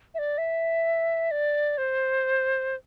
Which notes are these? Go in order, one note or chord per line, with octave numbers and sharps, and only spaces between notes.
E5
D5
E5
D5
C5